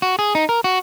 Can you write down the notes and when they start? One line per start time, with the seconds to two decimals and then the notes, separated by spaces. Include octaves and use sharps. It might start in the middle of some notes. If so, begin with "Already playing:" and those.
0.02 F#4
0.19 G#4
0.35 D#4
0.49 A#4
0.64 F#4